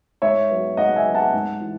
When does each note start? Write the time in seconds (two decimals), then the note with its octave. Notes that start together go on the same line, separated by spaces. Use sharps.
0.22 G#2 C#5 E5
0.50 F#3 B3
0.77 G#2 D#5 F#5
0.96 E5 G#5
1.05 F#3 B3
1.15 F#5 A5
1.34 G#2
1.61 E3